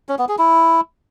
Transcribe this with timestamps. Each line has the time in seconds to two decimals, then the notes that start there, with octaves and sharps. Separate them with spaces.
0.09 C#4
0.19 B3
0.28 G#4
0.38 E4